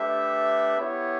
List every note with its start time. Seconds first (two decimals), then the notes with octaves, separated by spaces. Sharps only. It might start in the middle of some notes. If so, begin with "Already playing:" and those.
Already playing: A3 D4 G4 B4 E5
0.78 B3 E4 G4 C#5